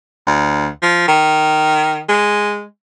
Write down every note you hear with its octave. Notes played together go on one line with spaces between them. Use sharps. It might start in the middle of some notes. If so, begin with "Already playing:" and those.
D2
F3
D#3
G#3